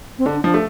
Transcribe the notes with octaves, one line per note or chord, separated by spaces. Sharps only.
C4
D3 D4
F3 D4
A3